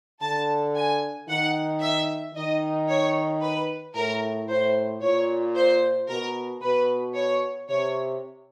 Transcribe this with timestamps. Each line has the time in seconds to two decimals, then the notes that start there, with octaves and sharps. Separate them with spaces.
0.21 D3 A5
0.75 G#5
1.28 D#3 F#5
1.81 E5
2.34 D#3 D#5
2.89 C#5
3.42 B4
3.95 A2 A#4
4.48 A2 C5
5.01 A#2 C#5
5.55 C5
6.08 B2 A#4
6.62 B2 B4
7.15 C#5
7.69 C3 C#5